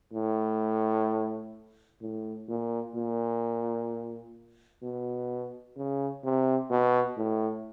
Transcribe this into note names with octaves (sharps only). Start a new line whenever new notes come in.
A2
A2
A#2
A#2
B2
C#3
C3
B2
A2